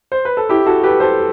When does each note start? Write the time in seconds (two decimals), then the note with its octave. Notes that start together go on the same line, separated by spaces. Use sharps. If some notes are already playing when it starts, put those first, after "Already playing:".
0.12 C5
0.25 B4
0.37 A4
0.49 E4 G4
0.66 F#4 A4
0.83 G4 B4
1.00 A4 C5